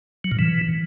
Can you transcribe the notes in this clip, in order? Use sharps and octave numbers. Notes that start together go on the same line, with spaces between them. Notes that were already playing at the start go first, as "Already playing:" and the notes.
F#3
A#2
E3